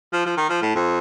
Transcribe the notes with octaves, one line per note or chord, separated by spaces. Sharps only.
F3
F3
D#3
F3
A2
F2